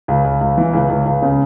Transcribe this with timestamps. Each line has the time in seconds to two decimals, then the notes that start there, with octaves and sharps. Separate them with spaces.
0.08 C#2
0.24 C#2
0.41 C#2
0.58 E3
0.73 C#2
0.89 C#2
1.06 C#2
1.22 C#3